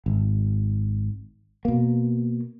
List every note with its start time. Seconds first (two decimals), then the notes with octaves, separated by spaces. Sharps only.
0.06 G#1
1.65 B2 A#3